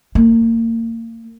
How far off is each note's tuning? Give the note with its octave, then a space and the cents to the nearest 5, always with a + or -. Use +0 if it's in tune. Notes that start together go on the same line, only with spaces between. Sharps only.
A#3 -30